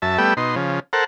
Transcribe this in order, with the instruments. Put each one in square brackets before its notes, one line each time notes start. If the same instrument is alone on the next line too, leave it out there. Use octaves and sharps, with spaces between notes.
[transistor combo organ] F#2 E5 A5
G3 A3 B3 G5 E6
B2 D#4 C6
C#3 F3
A4 A#4 C5 F#5